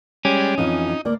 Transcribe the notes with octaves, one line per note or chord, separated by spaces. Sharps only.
G3 G#3 C#4 D5
F2 E3 D#4 F5
D2 A#3 D5